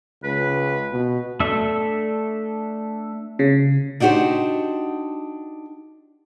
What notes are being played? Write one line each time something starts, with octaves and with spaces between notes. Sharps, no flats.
C#2 B4
B2
A3 D4 A4 E5
C#3
D4 D#4 F#4 G4 C5